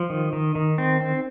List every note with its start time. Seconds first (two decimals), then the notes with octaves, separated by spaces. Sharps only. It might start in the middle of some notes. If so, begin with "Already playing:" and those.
Already playing: F3
0.10 D#3
0.33 D#3
0.55 D#3
0.78 C4
1.01 C4